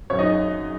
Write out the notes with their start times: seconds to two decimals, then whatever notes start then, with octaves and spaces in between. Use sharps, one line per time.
0.10 F#2 C#5
0.19 D#4 D#5